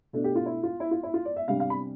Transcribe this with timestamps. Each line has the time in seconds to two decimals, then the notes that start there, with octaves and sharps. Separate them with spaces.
0.13 B2 A3 D4
0.24 G4
0.36 F4
0.46 E4
0.63 F4
0.80 E4
0.91 F4
1.03 E4
1.14 F4
1.25 D5
1.36 E5
1.48 C3 G3 D4 F5
1.60 F5
1.70 B5